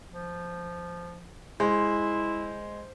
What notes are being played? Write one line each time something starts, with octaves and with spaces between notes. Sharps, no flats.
F3
G#3 E4 C5